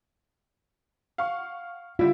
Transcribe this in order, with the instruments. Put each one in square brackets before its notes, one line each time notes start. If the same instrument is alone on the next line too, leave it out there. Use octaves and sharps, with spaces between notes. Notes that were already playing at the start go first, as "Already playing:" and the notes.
[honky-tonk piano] F5 F#5 C#6
[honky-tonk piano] D3 G3 E4 [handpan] F4